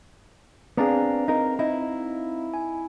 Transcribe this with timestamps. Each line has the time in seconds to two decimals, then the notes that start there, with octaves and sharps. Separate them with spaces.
0.77 B3 C4 D4 G#4 F5 A#5
1.28 D#4 A#4
1.59 D#4 E4
2.54 G#5